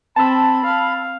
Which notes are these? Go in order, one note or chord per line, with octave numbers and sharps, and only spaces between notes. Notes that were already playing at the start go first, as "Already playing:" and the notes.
C4 A5 B5 E6
F5